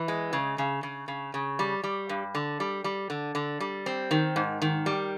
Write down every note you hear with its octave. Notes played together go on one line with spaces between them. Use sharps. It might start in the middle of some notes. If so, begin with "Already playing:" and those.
Already playing: E3
G#3
C#3
C#3
C#3
C#3
C#3
G3
G3
G2
D3
G3
G3
D3
D3
G3
C4
D#3
G#2
D#3
G3